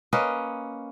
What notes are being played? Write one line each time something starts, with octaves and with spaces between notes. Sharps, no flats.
A#3 C#4 B4 D#5